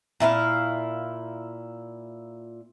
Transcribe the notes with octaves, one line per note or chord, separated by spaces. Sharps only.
A#2 E4 F4 F5